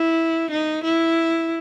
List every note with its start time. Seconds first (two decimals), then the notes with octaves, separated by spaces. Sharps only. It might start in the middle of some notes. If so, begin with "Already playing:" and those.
Already playing: E4
0.51 D#4
0.84 E4